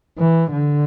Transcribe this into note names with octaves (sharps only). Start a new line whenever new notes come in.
E3
D3